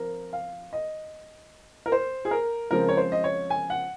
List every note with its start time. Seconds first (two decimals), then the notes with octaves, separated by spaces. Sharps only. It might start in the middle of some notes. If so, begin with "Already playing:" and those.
Already playing: F3 C4 A#4
0.33 F5
0.73 D#5
1.86 A#4
1.92 C5
2.25 G#4
2.31 A#4
2.71 C#3 F3 G#3 C4 A#4
2.89 C#5
2.97 C5
3.12 D#5
3.24 C#5
3.50 G#5
3.70 F#5